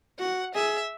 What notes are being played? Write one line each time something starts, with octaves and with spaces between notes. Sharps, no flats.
F#4 F#5
G#4 E5